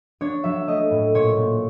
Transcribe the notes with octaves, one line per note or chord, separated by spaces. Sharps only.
D4 C#5
F#3 E5
A3 D#5
A2
A#2 C#5
A#2